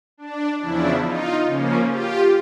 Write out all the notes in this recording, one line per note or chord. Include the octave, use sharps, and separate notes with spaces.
D4
E2 C#3 F3 D4 E4
D#4 F4
C#3 F3 A#3 C#4
F4 G4